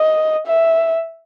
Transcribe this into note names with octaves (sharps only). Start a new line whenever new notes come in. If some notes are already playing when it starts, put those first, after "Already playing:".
Already playing: D#5
E5